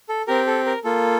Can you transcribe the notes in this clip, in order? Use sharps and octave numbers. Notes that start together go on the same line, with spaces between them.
A4
C4 G4 A#4
A4
A#4
A#3 F4 A4